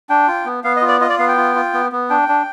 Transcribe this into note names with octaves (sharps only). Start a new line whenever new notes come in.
D4 G5
F4
B3
B3 F5
D#5
F4
D5
F4 D#5
D5
B3 F5
G5
F4
F4
B3
B3
D4 G5
D4